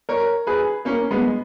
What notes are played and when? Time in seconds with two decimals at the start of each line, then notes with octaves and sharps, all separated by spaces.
0.09 A#4 C#5
0.47 G#4 B4
0.85 A#3 C#4
1.11 G#3 B3